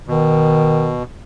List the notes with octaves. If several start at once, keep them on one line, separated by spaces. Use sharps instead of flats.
B2 D#3